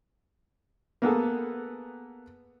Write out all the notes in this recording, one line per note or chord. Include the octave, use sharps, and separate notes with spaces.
A#3 B3 G#4 A4